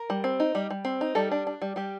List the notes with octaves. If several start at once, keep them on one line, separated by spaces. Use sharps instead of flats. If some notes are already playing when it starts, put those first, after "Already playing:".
Already playing: A#4
G3
C4
D#4
G3
G3
C4
D#4
G3 A4
D4
D4
G3
G3 G4